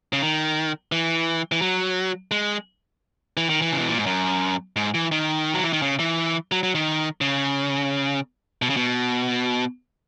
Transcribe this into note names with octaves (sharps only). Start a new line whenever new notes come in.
C#3
D#3
E3
E3
F#3
G#3
E3
D#3
E3
C#3
B2
A#2
G#2
F#2
G#2
E3
D#3
F#3
E3
D#3
C#3
E3
F#3
F#3
D#3
C#3
B2
C#3
B2